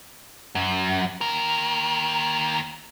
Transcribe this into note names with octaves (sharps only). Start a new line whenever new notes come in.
F#2
D#2 A#4